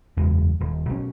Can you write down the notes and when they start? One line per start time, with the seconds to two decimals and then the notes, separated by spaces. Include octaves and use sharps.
0.16 F#1 E2 C#3 G#3
0.60 D#1
0.89 B1 C#4